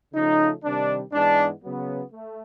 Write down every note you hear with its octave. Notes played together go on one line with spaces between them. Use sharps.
C#3 F3 A3 D#4
C3 D#3 G3 D4
G#2 E3 G#3 B3 D4
C#3 F#3 B3
A3